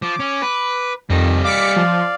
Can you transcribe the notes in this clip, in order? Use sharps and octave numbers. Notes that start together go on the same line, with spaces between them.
F3 D6
C#4
B4
F2 D#3 G3 D#5
D5 F5 D6 B6 C#7
F3